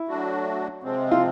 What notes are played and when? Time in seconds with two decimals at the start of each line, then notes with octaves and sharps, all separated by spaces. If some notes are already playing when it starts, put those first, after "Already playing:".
Already playing: E4
0.08 F#3 A3 D4 F#4
0.83 C3 F3 G#3 C4
1.11 F4